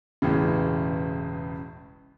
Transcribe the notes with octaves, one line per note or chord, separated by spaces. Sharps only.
E1 A1 A2 C#3